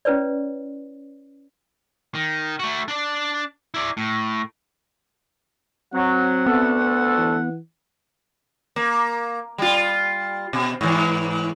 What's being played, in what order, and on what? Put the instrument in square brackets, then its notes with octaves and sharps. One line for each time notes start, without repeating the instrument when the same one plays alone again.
[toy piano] C#4 E4 B4 C#5 D5
[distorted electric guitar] D#3
A3 F#4
D4 D5
E4 D5
A2
[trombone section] F#3 [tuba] C4 [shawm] F#5
[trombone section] D2 A4 [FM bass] B3
[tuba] E3
[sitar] A#3
G3 F4
B2
G#2 E3